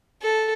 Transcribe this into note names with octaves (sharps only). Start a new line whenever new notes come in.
A4